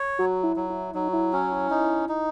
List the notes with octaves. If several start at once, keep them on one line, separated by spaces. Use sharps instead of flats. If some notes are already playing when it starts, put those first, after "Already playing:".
Already playing: C#5
F#3 F#4
E4
F#3
E4
F#3 D#4
F#4
E4
C#4 F#4
E4
D#4
D#4